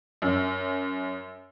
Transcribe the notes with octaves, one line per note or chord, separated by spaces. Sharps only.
F#2